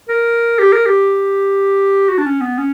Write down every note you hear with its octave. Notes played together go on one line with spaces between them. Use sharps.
A#4
G4
A#4
G4
F#4
D4
C#4
B3
C#4